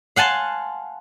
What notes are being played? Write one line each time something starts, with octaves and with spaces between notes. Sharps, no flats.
F5 F#5 G#5 A5 C6